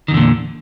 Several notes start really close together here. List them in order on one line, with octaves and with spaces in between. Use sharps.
D#3 E2 D3 A#2